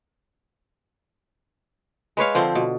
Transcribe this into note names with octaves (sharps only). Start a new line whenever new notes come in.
G#3 B4 C#5 F5
D3 F3 C4
B2